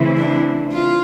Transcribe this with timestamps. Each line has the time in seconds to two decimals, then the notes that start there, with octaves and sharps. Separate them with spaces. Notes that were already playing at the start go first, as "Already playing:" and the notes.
Already playing: C#3 E3 A3 C4 E4
0.17 D4
0.73 F4